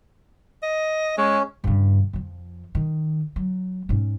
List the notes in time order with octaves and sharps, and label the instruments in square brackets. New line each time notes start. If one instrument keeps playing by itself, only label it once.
[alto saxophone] D#5
[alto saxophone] G#3 [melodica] C#4
[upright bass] G2 C#3
F2 F3
D#3
F#3
G#2 C#4